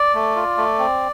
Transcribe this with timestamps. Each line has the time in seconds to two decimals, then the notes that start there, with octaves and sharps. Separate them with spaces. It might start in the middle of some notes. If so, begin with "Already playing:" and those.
Already playing: D5
0.15 A3
0.36 F4
0.57 A3
0.79 C4